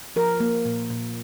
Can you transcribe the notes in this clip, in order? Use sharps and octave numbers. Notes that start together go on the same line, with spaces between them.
F3 A#4
A#3
A#2
A#2